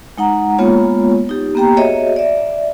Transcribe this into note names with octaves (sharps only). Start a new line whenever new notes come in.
G#3 D#4 F#5 A#5
G#3 A#3 B3 F4 C#5
D#4 G4
A#3 B3 G4 G5 A#5
F#4 G#4 C#5 D#5 E5
D5 E5